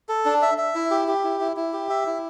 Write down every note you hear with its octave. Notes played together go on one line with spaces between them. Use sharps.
A4
D4
E5
E5
E4
G4
G4
E4
E4
E4
G4
E5
E4